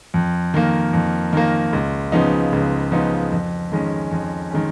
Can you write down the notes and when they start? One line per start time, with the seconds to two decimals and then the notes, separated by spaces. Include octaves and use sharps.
0.14 F2
0.54 D#3 A#3
0.93 F2
1.33 D#3 A#3
1.73 C#2
2.12 C#3 F3 B3 D#4
2.53 C#2
2.92 C#3 F3 B3 D#4
3.32 F2
3.72 D#3 G#3 C#4
4.11 F2
4.51 D#3 G#3 C#4